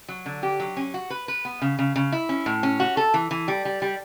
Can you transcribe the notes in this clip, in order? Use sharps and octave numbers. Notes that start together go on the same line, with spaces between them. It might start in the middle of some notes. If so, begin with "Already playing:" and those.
F#3
D3
G4
F#3
C#4
F#4
B4
B4
B3
C#3
C#3
C#3
E4
C#4
A2
C#4
F#4
A4
E3
E3
G3
G3
G3